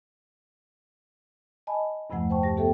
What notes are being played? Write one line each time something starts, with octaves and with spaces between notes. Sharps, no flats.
D#5 G#5 A5 B5
E2 G2 C3 F3 A3 F#5
C5 G5 A5 C#6
G2 G4 A5 A#6
B3 G4 A4 E5 G5